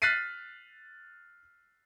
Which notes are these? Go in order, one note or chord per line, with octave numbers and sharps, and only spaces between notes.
F6 F#6 A6 B6 C7 D#7